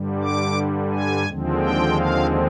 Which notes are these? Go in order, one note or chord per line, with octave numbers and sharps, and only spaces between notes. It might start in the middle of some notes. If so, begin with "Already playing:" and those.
Already playing: G2 D3 G3
D6
G#5
D#2 D3 F3 G#3 C4
G5
F5